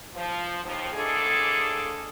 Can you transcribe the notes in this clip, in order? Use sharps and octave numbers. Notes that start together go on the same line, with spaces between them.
F3
D#2 F3
A2 G#3 A#3 D4 G#4 A4